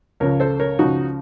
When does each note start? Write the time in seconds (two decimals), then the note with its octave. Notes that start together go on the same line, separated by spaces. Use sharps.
0.20 C#2 C#3 F3 A#4 C#5
0.40 A4 C5
0.60 A#4 C#5
0.79 C#2 C#3 F3 D#4 F#4